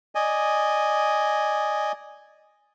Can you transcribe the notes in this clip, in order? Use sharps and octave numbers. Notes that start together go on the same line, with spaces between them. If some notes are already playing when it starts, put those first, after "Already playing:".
D5 D#5 G#5